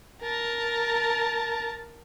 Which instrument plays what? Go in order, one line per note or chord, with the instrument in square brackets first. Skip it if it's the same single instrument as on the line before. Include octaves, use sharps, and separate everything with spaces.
[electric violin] A#4 A5